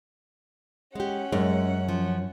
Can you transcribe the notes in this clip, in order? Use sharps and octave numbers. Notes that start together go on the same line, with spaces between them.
G#3 C#4 G4 F#5
F#2 G#3
F3